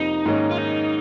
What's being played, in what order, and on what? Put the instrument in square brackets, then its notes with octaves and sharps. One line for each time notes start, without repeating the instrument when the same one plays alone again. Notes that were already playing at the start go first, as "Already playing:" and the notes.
Already playing: [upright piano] F2 C3 F3 A#3 [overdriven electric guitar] D#4
[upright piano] G#2 D#3 A#3 C#4
[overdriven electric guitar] F4
D#4